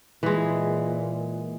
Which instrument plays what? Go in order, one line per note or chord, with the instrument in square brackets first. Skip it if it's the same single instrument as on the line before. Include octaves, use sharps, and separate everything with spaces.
[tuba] A#2 [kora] E3 G#3